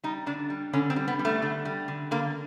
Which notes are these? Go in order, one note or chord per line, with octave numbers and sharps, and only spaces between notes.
G3 D#4
D3 D4
G3
D3 C#4
C4
G3
B3
G3
A3
D3
G3
D3
D3 A#3